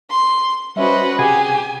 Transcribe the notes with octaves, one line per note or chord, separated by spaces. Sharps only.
C6
G3 C#4 F#4 B4 C5 D#5 E5
C3 G4 G#4 F#5 G#5